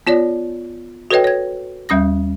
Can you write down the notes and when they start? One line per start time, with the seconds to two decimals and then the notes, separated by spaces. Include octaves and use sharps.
0.07 B3 F4 C#5 D5
1.11 F#4 A4 B4 C#5 D#5 G5
1.24 C#5 G#6
1.89 D#2 G3 C#4 D#6 A#6